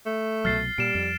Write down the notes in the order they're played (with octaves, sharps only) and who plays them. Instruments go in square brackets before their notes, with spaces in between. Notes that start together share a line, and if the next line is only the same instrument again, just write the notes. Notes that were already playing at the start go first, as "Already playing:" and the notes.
[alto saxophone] A3
[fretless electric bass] C2 B2 F#3 [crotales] F6 A6 C7
[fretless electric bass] A#2 [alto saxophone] G3 [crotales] D7 E7
[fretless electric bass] F2